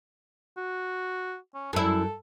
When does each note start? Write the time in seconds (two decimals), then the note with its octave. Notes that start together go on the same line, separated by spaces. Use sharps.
0.57 F#4
1.55 C#4
1.73 F#2 E4 A4